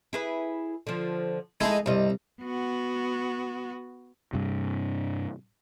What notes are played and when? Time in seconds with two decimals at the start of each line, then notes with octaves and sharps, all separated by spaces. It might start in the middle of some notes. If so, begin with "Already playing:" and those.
0.13 E4 G#4 B4
0.87 D3 F3
1.61 G#3 D#4 E4 G#4 A4
1.86 C2 G2 C3 D#5
2.42 B3 F#4
4.33 G2 C3